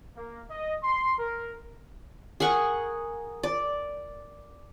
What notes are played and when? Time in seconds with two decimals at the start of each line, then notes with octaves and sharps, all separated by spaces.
0.17 A#3
0.50 D#5
0.83 C6
1.19 A#4
2.40 G#4 A#4 F#5 C#6
3.43 D5